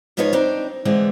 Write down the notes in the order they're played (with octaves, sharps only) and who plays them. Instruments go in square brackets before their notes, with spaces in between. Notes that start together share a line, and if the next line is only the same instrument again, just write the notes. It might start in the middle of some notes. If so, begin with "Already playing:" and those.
[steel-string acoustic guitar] G#2 F3 B3 D#4 F4 C#5
C4 D4 D#4
D3 E3 G#3 B3 C4